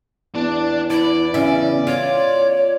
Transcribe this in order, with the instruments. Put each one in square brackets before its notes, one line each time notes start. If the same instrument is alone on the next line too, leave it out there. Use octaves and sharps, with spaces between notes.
[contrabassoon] E2 [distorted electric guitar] D4 D5
[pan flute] E4 [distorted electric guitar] D5
[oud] C#3 E5 [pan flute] C#4
[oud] F4 [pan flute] C#5